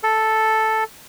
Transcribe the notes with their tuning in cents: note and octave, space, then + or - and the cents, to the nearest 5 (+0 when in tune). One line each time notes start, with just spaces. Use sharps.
A4 +0